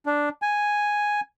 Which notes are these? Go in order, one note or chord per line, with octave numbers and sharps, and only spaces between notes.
D4
G#5